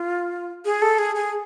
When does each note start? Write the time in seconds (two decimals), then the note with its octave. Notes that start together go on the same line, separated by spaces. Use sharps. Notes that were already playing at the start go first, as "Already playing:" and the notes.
Already playing: F4
0.65 G#4
0.82 A4
0.99 G#4
1.15 G#4